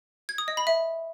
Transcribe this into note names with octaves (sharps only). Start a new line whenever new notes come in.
G#6
D#6
D#5
B5
E5